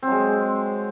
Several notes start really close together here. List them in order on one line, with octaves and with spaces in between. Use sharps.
C4 F#3 G#3